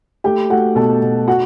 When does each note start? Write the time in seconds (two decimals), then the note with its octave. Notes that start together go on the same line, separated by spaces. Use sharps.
0.24 A3 G4 G5
0.50 A3 F#4 F#5
0.75 B2 A4 A5
1.01 B2
1.28 F#4 F#5